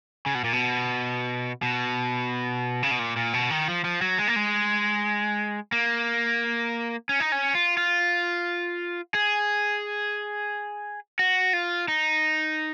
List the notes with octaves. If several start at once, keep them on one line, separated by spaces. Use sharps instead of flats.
C#3
B2
A#2
B2
B2
C#3
B2
A#2
A#2
B2
D#3
F3
F3
F#3
G#3
A#3
G#3
A#3
C#4
D#4
C#4
F4
F4
G#4
F#4
F4
D#4